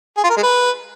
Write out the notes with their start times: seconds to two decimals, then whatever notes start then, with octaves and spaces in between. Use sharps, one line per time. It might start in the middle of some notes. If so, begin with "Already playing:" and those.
0.17 G#4
0.24 F4
0.30 A#4
0.37 G#3
0.43 B4